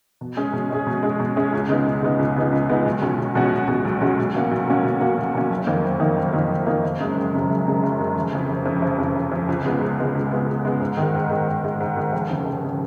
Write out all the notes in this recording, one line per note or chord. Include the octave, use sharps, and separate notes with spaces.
B2
G#3 C#4 G#4
B2
G#3 C#4 G#4
B2
G#3 C#4 G#4
B2
G#3 C#4 G#4
C#2
C#3 G#3 B3 D#4
C#2
C#3 G#3 B3 D#4
C#2
C#3 G#3 B3 D#4
C#2
C#3 G#3 B3 D#4
B1
B2 G#3 C#4 F#4
B1
B2 G#3 C#4 F#4
B1
B2 G#3 C#4 F#4
B1
B2 G#3 C#4 F#4
B1
B2 A#3 C#4 F#4
B1
B2 A#3 C#4 F#4
B1
B2 A#3 C#4 F#4
B1
B2 A#3 C#4 F#4
F#1
F2 D#3 A#3 D#4
F#1
F2 D#3 A#3 D#4
F#1
F2 D#3 A#3 D#4
F#1
F2 D#3 A#3 D#4
F#1
F#2 C#3 G#3
F#1
F#2 C#3 G#3
F#1
F#2 C#3 G#3
F#1
F#2 C#3 G#3
F1
F2 C#3
F1
F2 C#3
F1
F2 C#3
F1
F2 C#3
C#2
C#3 G#3 B3
C#2
C#3 G#3 B3
C#2
C#3 G#3 B3
C#2
C#3 G#3 B3
G#2
D#3 G#3
G#2
D#3 G#3
G#2
D#3 G#3
G#2
D#3 G#3
F1
D#2 C#3
F1
C#3